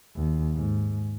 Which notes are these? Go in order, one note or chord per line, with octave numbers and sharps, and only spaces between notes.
D#2
G#2